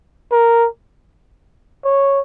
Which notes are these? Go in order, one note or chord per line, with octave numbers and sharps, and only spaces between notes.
A#4
C#5